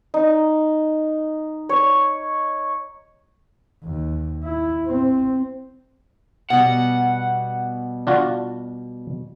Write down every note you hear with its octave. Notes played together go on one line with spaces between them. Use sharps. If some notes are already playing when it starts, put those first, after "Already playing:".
D#4
C#5
D#2
E4
C4
B2 G3 F#5
D4 F4 F#4